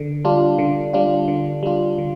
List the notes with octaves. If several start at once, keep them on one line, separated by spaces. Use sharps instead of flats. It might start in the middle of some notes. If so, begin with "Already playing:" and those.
Already playing: D3
G3 D4 F4
D3
G3 D4 F4
D3
G3 D4 F4
D3